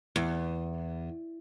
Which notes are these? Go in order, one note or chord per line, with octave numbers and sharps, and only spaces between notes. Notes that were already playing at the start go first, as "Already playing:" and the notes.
E2